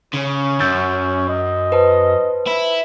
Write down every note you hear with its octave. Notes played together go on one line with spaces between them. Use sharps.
C#3 C#4
F#2 E6 G6 A6
D#5
B4 C5 A5
E4